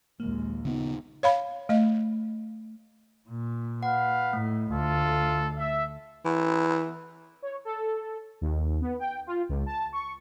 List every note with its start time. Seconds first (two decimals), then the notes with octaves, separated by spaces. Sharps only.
0.20 A#1 D#2 G#3 A#3
0.65 C#3 B3 D#4
1.23 C#5 F5 B5
1.69 A3 D#5
3.29 A#2
3.83 B4 F5 F#5
4.33 A2 A3
4.71 D2 F4 A4
5.58 E5
6.25 E3
7.42 C#5
7.65 A4
8.41 D#2
8.81 B3
8.99 G5
9.27 F4
9.49 C#2
9.66 A5
9.93 C#6